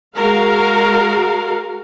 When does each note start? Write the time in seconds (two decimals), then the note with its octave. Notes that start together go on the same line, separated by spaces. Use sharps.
0.15 G#3 F#4 A#4 F5